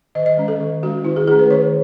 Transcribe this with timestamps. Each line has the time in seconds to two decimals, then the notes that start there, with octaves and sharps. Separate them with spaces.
0.15 D#3 D#5
0.26 D#5
0.37 G#3 C#4
0.48 A4
0.60 D#3
0.83 G#3 C#4 F#4
1.04 D#3 E4
1.16 G#4
1.27 A3 C#4 G#4
1.39 B4
1.50 D#3 C#5